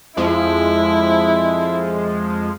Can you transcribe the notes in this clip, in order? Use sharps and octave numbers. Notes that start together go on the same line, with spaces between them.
F2 F3 G#3 E4